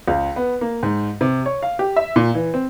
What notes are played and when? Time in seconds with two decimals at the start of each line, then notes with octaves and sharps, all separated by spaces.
0.08 C#2
0.36 B3
0.61 A#3
0.83 G#2
1.21 C3
1.46 C#5
1.63 F5
1.79 G4
1.96 E5
2.16 A#2
2.35 E3
2.54 C4